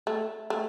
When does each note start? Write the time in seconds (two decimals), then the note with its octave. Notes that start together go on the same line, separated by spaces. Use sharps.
0.07 A3
0.50 A3